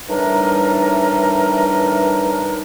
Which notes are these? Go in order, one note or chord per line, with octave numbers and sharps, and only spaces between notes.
A2 E3 G3 D4 D#4 A#4